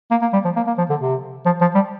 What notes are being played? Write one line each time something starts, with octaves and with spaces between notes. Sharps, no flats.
A#3
A#3
G3
F3
A#3
A#3
F3
D3
C3
F3
F3
G3